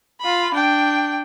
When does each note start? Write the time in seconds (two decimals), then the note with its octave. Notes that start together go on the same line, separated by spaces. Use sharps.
0.21 F4 B5
0.54 D4 G5